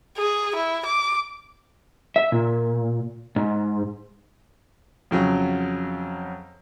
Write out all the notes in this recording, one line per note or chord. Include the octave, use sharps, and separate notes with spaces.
G#4
E4
D6
E5
A#2
G#2
F2 C#3 F#3